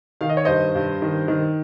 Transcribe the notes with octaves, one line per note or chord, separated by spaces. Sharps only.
D#3 F5
D#5
C#5
G2 C5 D#5
G2
D#3
D#3